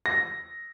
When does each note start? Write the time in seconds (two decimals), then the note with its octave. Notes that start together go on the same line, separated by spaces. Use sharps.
0.06 A#6